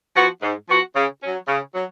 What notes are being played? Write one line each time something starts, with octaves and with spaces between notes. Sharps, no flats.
F3 B3 F#4
G#2
F3 B3 F#4
C#3
F#3 C#4
C#3
F#3